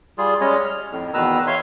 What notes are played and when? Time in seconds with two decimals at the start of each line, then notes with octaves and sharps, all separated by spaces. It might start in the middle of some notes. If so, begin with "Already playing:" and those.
0.18 G3 F4 G#4
0.41 G3 G#3 C#4 C#5 D#5
0.65 F6
0.91 F2 A2
1.14 E2 B2 D#3 B4 A#5 E6
1.47 C#5 E5 F5 C6